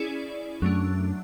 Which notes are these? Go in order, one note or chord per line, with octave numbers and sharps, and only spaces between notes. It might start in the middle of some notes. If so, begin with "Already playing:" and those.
Already playing: C#4 E4 G#4 D5
F#2 F#3 A3 D4